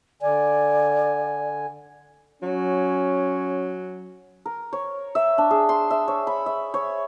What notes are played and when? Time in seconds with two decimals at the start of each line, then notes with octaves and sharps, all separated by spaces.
0.22 D3 D5 G#5
2.42 F#3 C#4
4.45 A#4
4.73 C#5
5.15 E5
5.38 D4
5.51 G#4
5.69 C6
5.90 E5
6.08 C#5
6.27 B5
6.46 E5
6.74 C#5